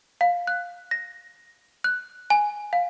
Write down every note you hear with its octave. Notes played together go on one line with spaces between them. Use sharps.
F5
F#6
A#6
F#6
G#5
F5